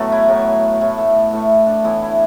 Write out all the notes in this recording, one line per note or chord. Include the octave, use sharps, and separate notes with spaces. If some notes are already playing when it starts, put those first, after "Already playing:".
Already playing: A2 F#3 A3 B3 A4 B4
E4
A2 F#3 A3
A2 A3 E4
A3 A4
A2 A3 E4
D4
A2 E3 B3 E4
E4